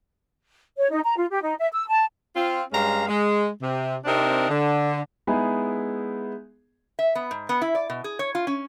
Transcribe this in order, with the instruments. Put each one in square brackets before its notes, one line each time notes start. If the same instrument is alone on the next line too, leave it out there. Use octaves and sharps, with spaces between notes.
[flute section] C#5
D#4
A#5
F4
G4
D#4
E5
E6
A5
[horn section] C4 F4
G2 G#3 C#4 F5 A#5
G#3
C3
C3 C4 D4 D#4 A#4
D3
[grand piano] G#3 B3 D#4 E4 G#4
[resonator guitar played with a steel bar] E5
B3
G#2
B3
E4
D5
B2
G#4
C#5
F4
C#4